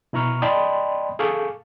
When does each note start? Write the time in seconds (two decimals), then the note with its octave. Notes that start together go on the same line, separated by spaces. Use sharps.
0.13 B2 E4 A#5 C#6 F6
0.42 D5 D#5 G5 A5 B5 C6
1.19 G#4 A4 F5 C#6 D6